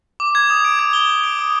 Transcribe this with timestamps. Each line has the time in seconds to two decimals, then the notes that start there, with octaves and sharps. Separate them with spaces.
0.20 D6
0.35 G#6
0.50 D#6
0.65 D7
0.79 G#6
0.93 G7
1.08 G6
1.23 D7
1.39 D#6